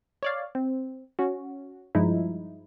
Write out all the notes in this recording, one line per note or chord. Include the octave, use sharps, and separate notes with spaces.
C#5 D5 F5
C4
C#4 F#4
G2 F3 G#3 D#4 E4